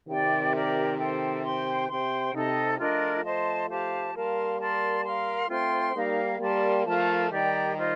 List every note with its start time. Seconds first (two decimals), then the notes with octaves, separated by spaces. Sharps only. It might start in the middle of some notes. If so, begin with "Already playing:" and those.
0.08 C3 D#3 G4 D5 G5
0.53 G4 A#4 D5
0.99 A4 C5 G5
1.43 C5 G5 C6
1.89 C3 C5 G5 C6
2.34 C3 D#4 A4 D#5 A5
2.79 F3 A3 D4 F4 A#4 D#5
3.25 C5 D#5 A5 C6
3.70 G4 C5 F5 A5
4.14 G3 A#3 A#4 F5 A5 C6
4.60 A#4 D5 A5 C6
5.05 A#4 F5 C6
5.49 A3 C4 F4 C5 G5 C6
5.95 G3 A#3 D#4 A#4 F5
6.40 G3 A#3 A#4 D5 A5 C6
6.85 F3 A3 F4 A#4 F5 A5
7.30 D#3 G3 G4 D5 G5 A#5
7.76 F4 C5 D#5